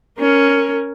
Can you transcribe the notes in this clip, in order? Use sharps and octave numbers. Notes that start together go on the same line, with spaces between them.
C#4 A#4